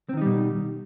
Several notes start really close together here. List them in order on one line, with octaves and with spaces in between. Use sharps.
C4 D#3 D#4 G3 B2